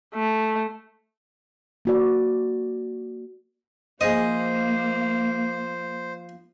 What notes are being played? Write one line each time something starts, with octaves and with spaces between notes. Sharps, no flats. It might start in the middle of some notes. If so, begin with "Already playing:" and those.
A3
A#3 F#4 D5
F3 A#3 G#4 C5 D#5